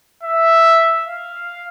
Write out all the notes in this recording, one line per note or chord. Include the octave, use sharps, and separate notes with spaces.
E5
F5